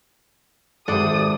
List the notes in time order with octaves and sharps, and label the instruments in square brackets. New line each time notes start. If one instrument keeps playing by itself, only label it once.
[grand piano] G#1 [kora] C3 C5 F#5 [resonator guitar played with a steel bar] A4 D5 [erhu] D#6